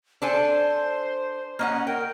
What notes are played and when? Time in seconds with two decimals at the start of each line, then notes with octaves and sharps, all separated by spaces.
0.22 D4 A4 C5 G#5
1.59 A#3 C#4 D#5 F#5
1.87 A#4 G5